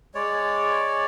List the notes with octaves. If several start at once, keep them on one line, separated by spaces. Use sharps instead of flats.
G#3 C#5 D5